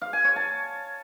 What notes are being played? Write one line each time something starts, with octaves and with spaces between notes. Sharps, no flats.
F5
G#5
C#5
A5